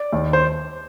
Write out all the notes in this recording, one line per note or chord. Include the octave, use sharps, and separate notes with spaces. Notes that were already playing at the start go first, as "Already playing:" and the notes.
Already playing: D5
D#2 D#3
C5